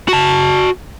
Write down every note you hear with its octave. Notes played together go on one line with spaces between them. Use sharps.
F#4 A5